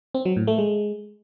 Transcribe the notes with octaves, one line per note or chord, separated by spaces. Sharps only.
C4
F#3
A2
A3
G#3